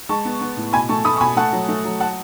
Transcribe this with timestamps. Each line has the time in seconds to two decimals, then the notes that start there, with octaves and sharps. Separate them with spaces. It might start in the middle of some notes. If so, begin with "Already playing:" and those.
0.09 G#3 A5 C#6
0.25 B3
0.41 B3
0.57 A2
0.73 B2 G#5 B5
0.89 A3 A5 C#6
1.05 A3 B5 D#6
1.17 C#6
1.21 B2 G#5 B5
1.36 A3 F#5 A5
1.53 F#3
1.68 A3
1.85 F#3
2.00 F#5 A5